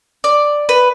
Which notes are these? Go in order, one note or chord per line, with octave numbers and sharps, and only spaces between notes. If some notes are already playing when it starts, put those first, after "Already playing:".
D5
B4